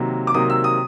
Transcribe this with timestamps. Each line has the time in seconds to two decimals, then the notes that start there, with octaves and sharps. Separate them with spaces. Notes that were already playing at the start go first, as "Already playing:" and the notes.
Already playing: C3 D#3 F#3 A#3
0.27 D6
0.34 C3 D#3 F#3 A#3 D#6
0.50 E6
0.64 D#6